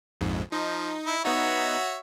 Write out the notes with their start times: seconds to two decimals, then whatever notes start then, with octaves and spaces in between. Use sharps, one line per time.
0.21 A#1 F2 G#2
0.52 F3 D#4
1.07 E4
1.25 B3 D#4 F#4 C#5 E5